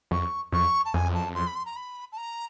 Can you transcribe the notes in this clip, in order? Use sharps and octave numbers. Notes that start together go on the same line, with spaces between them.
F2 C#6
F2 C#6
A5
F2 G#5
A5
C6
B5
C6
A#5
B5
A5
A#5